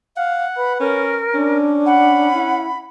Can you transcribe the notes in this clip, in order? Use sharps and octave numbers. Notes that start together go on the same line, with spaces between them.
F5 F#5
B4 B5
C#4 A#4
C#4 D4
F#5 B5
E4